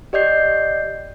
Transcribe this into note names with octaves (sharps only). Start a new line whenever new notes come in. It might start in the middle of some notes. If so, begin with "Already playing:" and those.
G4 D5 D#5 G6 C7